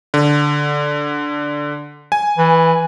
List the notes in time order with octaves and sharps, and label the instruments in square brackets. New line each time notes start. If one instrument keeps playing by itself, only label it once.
[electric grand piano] D3
G#5
[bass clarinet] E3